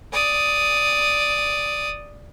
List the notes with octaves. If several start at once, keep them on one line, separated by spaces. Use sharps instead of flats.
D5 D#6